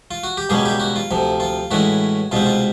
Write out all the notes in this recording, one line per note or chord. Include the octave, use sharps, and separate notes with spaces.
F4
F#4
G4
C#2 B2 G3 A#3 C#4 G#4
G4
F#4
F4
D2 C3 F3
F4
A2 E3 G#3 C#4 F#4
C2 B2 G#3 C4 F4
F4